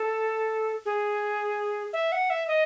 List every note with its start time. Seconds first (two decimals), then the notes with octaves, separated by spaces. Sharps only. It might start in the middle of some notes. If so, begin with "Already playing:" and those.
Already playing: A4
0.85 G#4
1.93 E5
2.12 F#5
2.30 E5
2.48 D#5